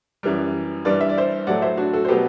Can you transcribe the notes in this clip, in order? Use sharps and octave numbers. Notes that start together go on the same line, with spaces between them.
F#2 E3 G3
G2 E3 G3 B4 D5
E5
D5
C5 E5
A2 F#3 A3 D5 F#5
C5 E5
D4 F#4
F#4 A4
C5
B2 F#3 A3 G4 B4